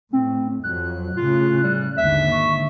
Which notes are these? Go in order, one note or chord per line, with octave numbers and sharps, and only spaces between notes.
A2 C4
F2 F#3 F#6
A2 C#3 F4
G3
G#1 D#2 D3 E5
C#6